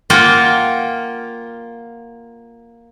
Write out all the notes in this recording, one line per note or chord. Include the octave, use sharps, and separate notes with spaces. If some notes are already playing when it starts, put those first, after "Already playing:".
A#3 F4 F#5 G5